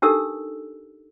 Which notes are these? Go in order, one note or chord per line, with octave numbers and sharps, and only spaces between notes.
D4 D#4 G4 A4 A#4 E6